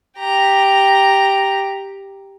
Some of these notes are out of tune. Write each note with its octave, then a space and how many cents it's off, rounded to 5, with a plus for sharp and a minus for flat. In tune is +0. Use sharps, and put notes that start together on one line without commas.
G4 +0 A#5 +0